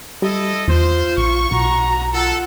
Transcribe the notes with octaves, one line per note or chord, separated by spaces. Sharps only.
G3 E4 A4 D#5
E2 F4 C5
A#1 C#6
B1 F#4 A#5
F4 A4 F#5